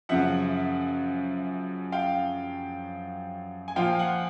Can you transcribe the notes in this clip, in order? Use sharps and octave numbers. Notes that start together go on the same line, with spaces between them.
F#2 C#3 F3 E5 F#5
F5 G5
G#5
A#2 F3 F5 G5
F#5 G#5